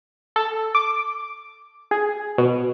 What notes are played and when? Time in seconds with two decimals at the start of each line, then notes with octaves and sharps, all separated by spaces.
0.36 A4
0.75 D6
1.91 G#4
2.38 B2